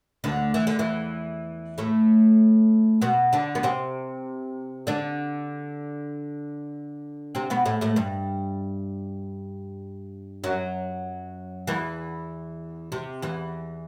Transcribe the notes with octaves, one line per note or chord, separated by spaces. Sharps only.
D2 D3
E3
D3
E2 E3
A2 A3
B2 B3
D3 D4
B3
C3 C4
D3 D4
C3 C4
B2 B3
A2 A3
A2 A3
G2 G3
F#2 F#3
E2 E3
C3
E2 E3